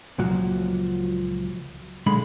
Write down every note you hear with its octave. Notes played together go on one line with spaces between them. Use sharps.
C#2 A#2 F3 F#3
B1 D3 G#3 B5